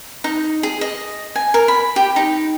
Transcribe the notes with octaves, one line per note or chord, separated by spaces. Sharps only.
D#4
G#4
D#5
G#5
A#4
B5
G4
D#4